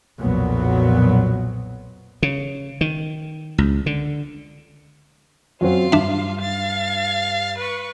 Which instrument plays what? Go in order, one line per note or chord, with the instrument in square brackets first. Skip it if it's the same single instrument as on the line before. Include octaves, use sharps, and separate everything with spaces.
[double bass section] B1 F2 A#2 F#3 B3
[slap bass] C#3
D#3
C#2
D3
[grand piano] F#2 F#3 C4 [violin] F4 F5
[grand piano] G2 [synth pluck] D4 E5
[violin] F5 A6
B4 C#6